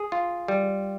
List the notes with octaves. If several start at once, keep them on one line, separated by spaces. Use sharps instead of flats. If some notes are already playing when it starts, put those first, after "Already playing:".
Already playing: G#4
F4
G3